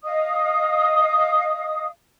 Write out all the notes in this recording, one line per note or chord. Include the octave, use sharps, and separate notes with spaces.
D#5 F5 D#6